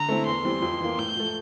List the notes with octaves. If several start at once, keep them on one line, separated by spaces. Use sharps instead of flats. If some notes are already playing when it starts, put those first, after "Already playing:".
Already playing: D3 A#5
A3 C4 E4
E2 C6
E3 G3 C4
F2
E3 A#3
A2 G6
F3 A3